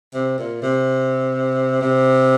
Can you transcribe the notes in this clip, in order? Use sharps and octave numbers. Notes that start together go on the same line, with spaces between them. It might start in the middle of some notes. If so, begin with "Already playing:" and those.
C3
A#2
C3
C3